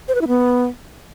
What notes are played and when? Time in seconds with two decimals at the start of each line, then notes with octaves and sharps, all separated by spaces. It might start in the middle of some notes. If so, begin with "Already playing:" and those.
0.08 C5
0.15 B4
0.21 E4
0.28 B3